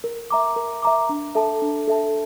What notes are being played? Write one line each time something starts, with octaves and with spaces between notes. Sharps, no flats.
A#4
E5 A#5 D6
A#4
E5 A#5 D6
D4
A4 E5 A5
D4
A4 E5 A5